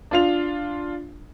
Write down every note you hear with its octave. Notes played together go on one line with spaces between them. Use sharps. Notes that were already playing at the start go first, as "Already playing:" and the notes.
D4 F4 F7